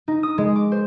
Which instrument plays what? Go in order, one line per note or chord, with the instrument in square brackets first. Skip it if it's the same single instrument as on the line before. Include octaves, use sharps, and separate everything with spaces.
[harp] D#4
D#6
G#3
D6
C5